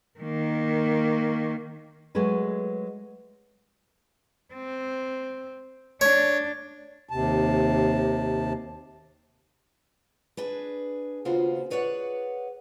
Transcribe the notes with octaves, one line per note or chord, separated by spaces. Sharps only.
D#3 A#3
F#3 G#3 A3 G#4 B4
C4
D4 C#5
D#2 C3 A5
D4 G#4 B4
D#2 C#3 B3 F4 F#4 C5
G#4 B4 C#5 D5 F5 F#5